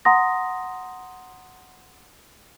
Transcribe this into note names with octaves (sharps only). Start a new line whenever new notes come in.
F#5 A#5 C6 D#6 A#6